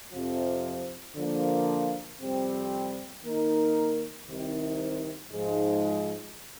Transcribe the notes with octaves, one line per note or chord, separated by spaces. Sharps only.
F2 C3 F3
D3 F3 A#3
F2 C3 G3 C4 G4
D#3 A#3 D#4 A#4
C2 C3 D#3
G#2 F3 G#3